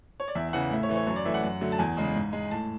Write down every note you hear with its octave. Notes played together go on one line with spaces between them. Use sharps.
C#5
D5
E2 E5
E5
C#3 E3 F#5
A2 E5
C#5
E3 A3
C#5
F#2 C#5
D5
E3 A3 E5
F#5
F#2
D3 F#3 A3
A5
E2 G#5
C#3 G#3
G#2
G#3
A2 A5